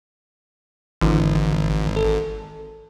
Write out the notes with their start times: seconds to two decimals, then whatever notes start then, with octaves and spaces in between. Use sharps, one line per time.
1.01 G#1 D3 E3
1.96 A4